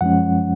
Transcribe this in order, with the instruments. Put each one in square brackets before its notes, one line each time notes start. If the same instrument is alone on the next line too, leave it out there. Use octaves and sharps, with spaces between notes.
[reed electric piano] F#2 F3 G#3 C#4 F#5